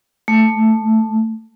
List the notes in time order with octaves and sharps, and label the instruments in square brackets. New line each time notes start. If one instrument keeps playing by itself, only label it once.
[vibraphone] A3